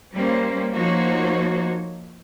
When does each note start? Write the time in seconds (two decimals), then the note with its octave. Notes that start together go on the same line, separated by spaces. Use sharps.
0.14 G3 A#3 C#4 C5
0.75 F3 A#3 D#4 F#4 C5 C#5